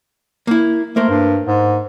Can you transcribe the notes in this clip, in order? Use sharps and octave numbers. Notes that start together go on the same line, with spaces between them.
A#3 E4
A3 A#3 A#4 C5
G2
G#2